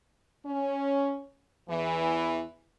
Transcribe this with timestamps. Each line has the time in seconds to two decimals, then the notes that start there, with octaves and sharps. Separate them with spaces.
0.46 C#4
1.69 E2 E3